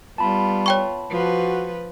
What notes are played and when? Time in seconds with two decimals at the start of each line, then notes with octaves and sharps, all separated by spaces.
0.18 G3 B3 F4 A5 B5
0.66 C#5 G5 C#6
1.10 F3 F#4 B4